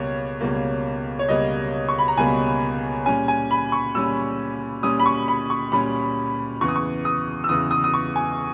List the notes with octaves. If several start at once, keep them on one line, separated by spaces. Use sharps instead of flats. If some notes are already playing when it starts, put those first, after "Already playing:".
Already playing: C#2 B2 G3 A#3 C#5
C#2 B2 G3 A#3
C#5
C#2 B2 G3 A#3 D#5
C#6
B5
A#5
C#2 B2 G3 A#3 G#5
A#2 G3 C#4 G#5
G#5
B5
C#6
A#2 G3 C#4 E6
A#2 G3 C#4 D#6
B5
C#6
B5
C#6
A#2 G3 C#4 B5
E2 C#3 E3 C#6
D#6
C#6
D#6
E6
E2 C#3 E3 D#6
D#6
D#6
C#6
G#5